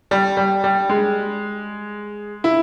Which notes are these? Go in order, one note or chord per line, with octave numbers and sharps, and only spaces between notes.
G3
G3
G3
G#3
E4